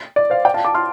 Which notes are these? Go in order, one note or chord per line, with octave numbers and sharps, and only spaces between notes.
D5
C5 F5
D5 G5
F5 A5
A5 D6
C6 F6